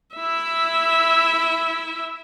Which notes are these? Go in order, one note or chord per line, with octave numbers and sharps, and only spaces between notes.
E4 E5